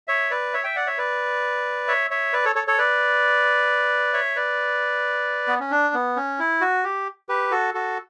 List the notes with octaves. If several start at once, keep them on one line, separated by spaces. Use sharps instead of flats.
C#5 E5
B4 D5
C#5 E5
E5 G5
D5 F#5
C#5 E5
B4 D5
C#5 E5
C#5 E5
B4 D5
A4 C#5
A4 C#5
A4 C#5
B4 D5
C#5 E5
B4 D5
B3
C#4
D4
B3
C#4
E4
F#4
G4
G4 B4
F#4 A4
F#4 A4